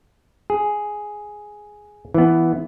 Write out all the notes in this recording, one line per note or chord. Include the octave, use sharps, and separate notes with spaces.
G#4
E3 B3